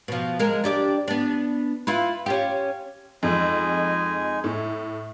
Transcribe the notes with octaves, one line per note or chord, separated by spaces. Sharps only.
B2 F3
G#3 A#4
D4 G4 D5
B3 D4
E4 F4 B4
C#4 F4 G4
F2 G#3 D#4 G#5
A2